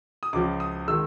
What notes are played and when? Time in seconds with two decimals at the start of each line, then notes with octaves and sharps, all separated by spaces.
0.23 D#6
0.33 C#2 C#3 F3 D6
0.60 D#6
0.88 D#3 G#3 E6